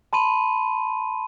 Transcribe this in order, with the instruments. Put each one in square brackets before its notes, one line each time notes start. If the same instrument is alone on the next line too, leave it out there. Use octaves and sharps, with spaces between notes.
[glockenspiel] A5 B5 C6 D#7